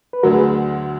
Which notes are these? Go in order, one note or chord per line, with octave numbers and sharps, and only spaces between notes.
B4
D2 D3 F#3 F#4 A#4
G#4 B4